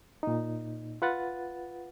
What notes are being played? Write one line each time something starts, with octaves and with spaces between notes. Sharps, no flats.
A#2 D#4
F4 B4 F#5 A6